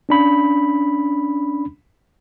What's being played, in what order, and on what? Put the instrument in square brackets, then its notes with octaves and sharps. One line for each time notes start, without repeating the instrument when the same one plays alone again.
[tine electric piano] C#4 D4 B5